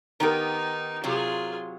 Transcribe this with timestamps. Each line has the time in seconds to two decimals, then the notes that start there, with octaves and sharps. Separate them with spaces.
0.20 D#3 B3 D#4 G4 A#4 A#5
1.04 C3 F#3 F4 G#4